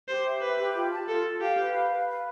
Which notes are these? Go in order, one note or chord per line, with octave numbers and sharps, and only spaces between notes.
G4 C5
E5
B4 E5
G4
F4
A5
F4 A4
A4
G4 F5
B4
F5
B4
F5